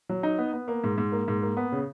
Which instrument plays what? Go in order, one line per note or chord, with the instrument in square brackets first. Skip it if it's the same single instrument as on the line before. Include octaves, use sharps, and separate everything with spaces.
[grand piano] F#3
D#4
B3
B3
A#3
G#2
G#2
A#3
G#2
A#3
B3
C#3